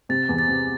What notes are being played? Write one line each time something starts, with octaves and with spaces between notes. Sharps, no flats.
C3 A6
E2
A6
C3